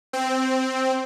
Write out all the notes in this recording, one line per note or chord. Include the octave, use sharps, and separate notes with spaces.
C4